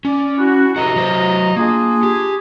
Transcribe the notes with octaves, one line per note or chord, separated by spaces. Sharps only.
C#4 D5
E4 F#4
C3 F#4 A4 B4 D#5 A#5
F#3 C5
A#3 D4 F4 G#4
G4